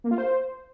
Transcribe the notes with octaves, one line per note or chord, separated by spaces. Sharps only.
A#3
F4
C5